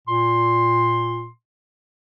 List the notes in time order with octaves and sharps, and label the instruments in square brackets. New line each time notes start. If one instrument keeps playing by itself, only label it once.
[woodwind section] A#2 C6